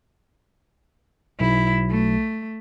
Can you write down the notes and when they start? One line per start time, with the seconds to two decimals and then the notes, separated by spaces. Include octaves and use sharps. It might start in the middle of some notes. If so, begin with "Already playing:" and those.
1.40 B1 E4
1.90 A3